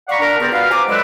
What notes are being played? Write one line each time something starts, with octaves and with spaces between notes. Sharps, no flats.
D5 F5 F#5 A#5 B5 C#6
D4 A#4
G2 C#3 B3 C4 A#4 D5
B2 B3 F4 B4 F5
C3 G#5 A#5 D6
D3 F#3 G#3 A3 D4 B4